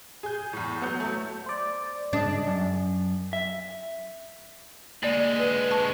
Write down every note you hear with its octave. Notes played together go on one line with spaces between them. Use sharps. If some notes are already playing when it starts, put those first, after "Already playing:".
G#4 G6
E2 A2
F#3 B3 G6
F#3 A3
C5 D5
C#3 D4 D#5
F#2
E5
D3 G#3 A#3 D5
B4
A5 C#6